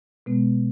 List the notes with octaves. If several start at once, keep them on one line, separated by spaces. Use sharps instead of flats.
B2 G#3 B3